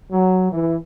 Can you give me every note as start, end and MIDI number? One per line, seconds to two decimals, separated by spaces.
0.11 0.48 54
0.52 0.76 52